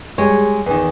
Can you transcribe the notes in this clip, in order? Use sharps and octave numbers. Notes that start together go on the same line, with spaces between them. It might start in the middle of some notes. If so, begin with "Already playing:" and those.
G3 G#3 C#5
E2 D#3